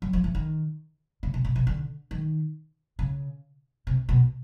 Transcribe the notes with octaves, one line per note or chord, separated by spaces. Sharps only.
F#3
F3
E3
D#3
C#3
C3
B2
B2
D3
D#3
C#3
C3
B2